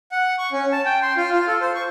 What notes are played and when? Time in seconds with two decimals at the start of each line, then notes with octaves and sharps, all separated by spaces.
0.12 F#5
0.38 C#6
0.52 C#4
0.72 A5
0.86 G5
1.02 C6
1.17 F4
1.33 F4
1.47 A4
1.61 C5
1.75 C#6